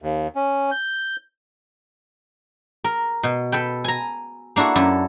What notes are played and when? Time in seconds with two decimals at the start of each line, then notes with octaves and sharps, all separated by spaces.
0.02 D#2
0.35 C#4
0.72 G6
2.84 A#4
3.23 B2
3.52 A4 B4 G5
3.84 G#5 A#5
4.56 A#3 D4 E4 F#4 A4
4.76 F#2 E4 A4